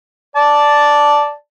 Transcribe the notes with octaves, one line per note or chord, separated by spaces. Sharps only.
D5 A5